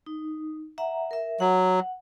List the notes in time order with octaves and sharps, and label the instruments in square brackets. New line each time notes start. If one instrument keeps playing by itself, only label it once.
[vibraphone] D#4
E5 F#5 A#5
A#4 E5
[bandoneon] F#3 [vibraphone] F#5